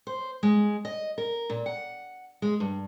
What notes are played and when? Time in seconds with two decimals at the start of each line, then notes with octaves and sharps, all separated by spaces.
0.07 C5
0.43 G#3
0.85 D#5
1.18 A#4
1.50 A#2
1.66 F#5
2.42 G#3
2.60 G2